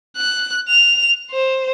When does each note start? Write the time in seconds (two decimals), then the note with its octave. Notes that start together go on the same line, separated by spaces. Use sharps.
0.17 F#6
0.69 F7
1.31 C5